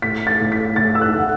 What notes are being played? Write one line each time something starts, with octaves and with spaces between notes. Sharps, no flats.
A2 B6
A6
A2
B6
A2 A6
E6
F#6
A3 F#5